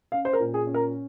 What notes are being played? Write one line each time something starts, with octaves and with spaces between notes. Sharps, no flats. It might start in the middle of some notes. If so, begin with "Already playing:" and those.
C#4 F5
C5
A#4
A#2
G#4
C#4
A#4